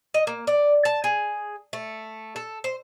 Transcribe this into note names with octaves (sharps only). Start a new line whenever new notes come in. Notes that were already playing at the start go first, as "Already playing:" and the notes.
D#5
A#3
D5
A5
G#4
A3
A4
C5